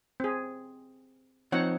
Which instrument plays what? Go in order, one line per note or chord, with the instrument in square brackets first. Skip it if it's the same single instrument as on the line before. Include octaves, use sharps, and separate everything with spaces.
[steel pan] C4 G#4
[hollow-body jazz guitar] F3 C4 D#4 [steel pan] C#5 F#5